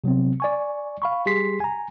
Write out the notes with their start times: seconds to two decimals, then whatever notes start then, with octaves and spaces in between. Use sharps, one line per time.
0.04 C3 F#3 B3 C4
0.40 D5 G#5 C#6
1.02 F5 B5 C#6
1.26 G3 G4 G#4 C6 B6 C7
1.60 G#5 A#5